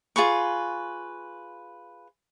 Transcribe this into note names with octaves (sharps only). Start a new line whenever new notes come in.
F4 G#4 B4 C#6